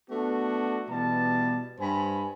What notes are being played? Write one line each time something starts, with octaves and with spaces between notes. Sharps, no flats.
A3 B3 D4 F#4
B2 E3 G3 A5
G2 C5 G#5 B5